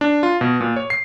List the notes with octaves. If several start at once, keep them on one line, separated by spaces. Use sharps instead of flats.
D4
F4
B2
A#2
C#5
C7